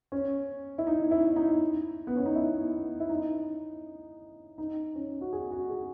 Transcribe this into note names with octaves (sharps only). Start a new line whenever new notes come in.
C#4
E4
D#4
E4
D#4
B3
C#4
D#4
E4
E4
D#4
D#4
C#4
F#4
G#4
F#4
G#4